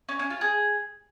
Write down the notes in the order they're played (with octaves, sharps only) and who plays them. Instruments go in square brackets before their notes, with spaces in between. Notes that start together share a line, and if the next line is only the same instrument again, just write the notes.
[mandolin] C#4
C#4
F4
G#4